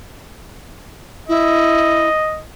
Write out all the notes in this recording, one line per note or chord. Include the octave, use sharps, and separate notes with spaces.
E4 D#5